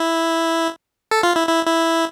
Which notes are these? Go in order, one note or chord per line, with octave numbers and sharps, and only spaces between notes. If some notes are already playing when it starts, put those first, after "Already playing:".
Already playing: E4
A4
F4
E4
E4
E4